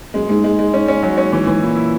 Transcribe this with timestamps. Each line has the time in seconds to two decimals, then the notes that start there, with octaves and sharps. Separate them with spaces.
0.14 F#2 G#3
0.29 G#2 G#3
0.44 G#3
0.59 G#3
0.74 G#2 C#4
0.88 G#2 C#4
1.03 F#3
1.18 C#4
1.33 E3
1.47 E3
1.62 A#2 E4
1.76 E4